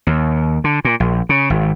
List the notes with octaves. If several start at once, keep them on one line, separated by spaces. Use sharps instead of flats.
D#2
D3
A#2
A#1
C#3
G#1